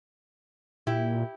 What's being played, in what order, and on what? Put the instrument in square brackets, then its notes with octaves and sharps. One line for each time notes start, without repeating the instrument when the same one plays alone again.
[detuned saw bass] A#2 [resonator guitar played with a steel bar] E4 G4